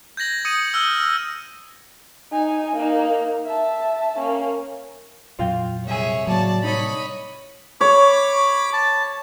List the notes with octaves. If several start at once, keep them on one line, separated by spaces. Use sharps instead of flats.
G6 G#6 A#6 F#7
D#6 G#6 C#7 D#7
E6 F6 G6
D#4 G#5
A#3 D#4
E5 A5
A#3 C#4
F2 A#2 F#3 F4 F5 G5
C2 G#4 C#5 E5 G#5
A2 C#3 F#3 A#3 D5 A5
C2 D#4 C#5 D#5 B5
C#5 B5 D6
A5